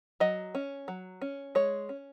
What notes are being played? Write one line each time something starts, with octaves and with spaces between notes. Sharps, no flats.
F#3 D#5
C#4
F#3
C#4
G#3 C#5
C#4